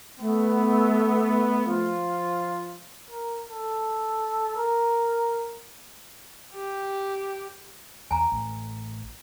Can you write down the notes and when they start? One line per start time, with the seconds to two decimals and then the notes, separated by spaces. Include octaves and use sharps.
0.20 A3 B3
1.67 F3 F4
3.11 A#4
3.51 A4
4.57 A#4
6.54 G4
8.11 E2 G#5 A#5
8.32 A1